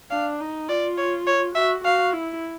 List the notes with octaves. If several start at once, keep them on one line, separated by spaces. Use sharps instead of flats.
D4 F5
D#4
F4 D5
C#5
C#5
F#4 E5
F#4 F5
E4